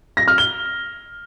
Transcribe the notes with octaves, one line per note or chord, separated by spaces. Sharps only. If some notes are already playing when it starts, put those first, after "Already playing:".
A#6
F6
G7